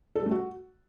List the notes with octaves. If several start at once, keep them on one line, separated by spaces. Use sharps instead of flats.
A4
G3
A3
F#4